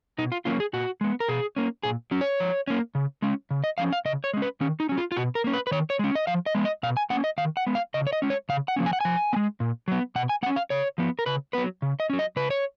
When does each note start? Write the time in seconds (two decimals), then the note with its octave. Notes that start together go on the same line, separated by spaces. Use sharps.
0.18 B2 D#4
0.32 F4
0.45 F#3 A#3 C#4 F4
0.60 G#4
0.73 A#2 F#4
1.01 G#3 B3
1.20 A#4
1.28 B2 G#4
1.56 A#3 C#4
1.83 A#2 G#4
2.11 F#3 C#4
2.21 C#5
2.40 F3
2.67 A#3 C#4
2.95 C#3
3.22 G#3 C#4
3.51 C#3
3.64 D#5
3.78 F3 A#3 C#4 F5
3.92 F5
4.05 C#3 D#5
4.24 C#5
4.34 G#3 C#4
4.42 B4
4.61 D#3 C#4
4.80 D#4
4.89 F#3 C#4
4.98 F4
5.12 F4
5.17 B2 F#4
5.35 A#4
5.44 A#3 C#4
5.54 B4
5.67 B4
5.71 D#3 C#5
5.90 C#5
5.99 G#3 C#4
6.15 D#5
6.27 F3 F5
6.46 D#5
6.55 G#3 B3
6.65 D#5
6.83 B2 F5
6.97 G#5
7.10 A#3 C#4 F#5
7.24 D#5
7.38 D#3 F5
7.57 F#5
7.67 G#3 B3
7.75 F5
7.94 C#3 D#5
8.07 C#5
8.13 D#5
8.22 G#3 C#4
8.30 C#5
8.49 C#3 F5
8.68 F#5
8.76 F3 A#3 C#4
8.86 G#5
8.93 F#5
9.01 F3 G#5
9.33 B3
9.36 G#3
9.60 A#2
9.88 F#3 B3
10.15 B2 F#5
10.29 G#5
10.43 A#3 F#5
10.46 C#4
10.56 F5
10.70 C#3 C#5
10.98 F3 B3
11.19 A#4
11.26 C#3 B4
11.53 F#3 B3 B4
11.82 C#3
12.00 D#5
12.10 F#3 C#4
12.19 D#5
12.36 C#3 B4
12.50 C#5